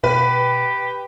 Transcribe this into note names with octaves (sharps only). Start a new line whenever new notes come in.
B2 G4 B4